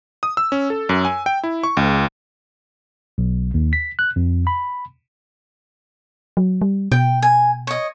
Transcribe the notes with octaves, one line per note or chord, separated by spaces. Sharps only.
D#6
E6
C#4
A4
F#2
G#5
G5
E4
C#6
C#2
B1
D#2
B6
F#6
F2
B5
F#3
G3
B2 G5
G#5
C#5 D#5